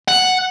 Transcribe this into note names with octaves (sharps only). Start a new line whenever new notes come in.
F#5